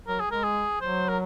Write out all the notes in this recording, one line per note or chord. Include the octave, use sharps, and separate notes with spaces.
F#3 A#4
G#4
G#3
A#4
G#4
F#3 C5
A#4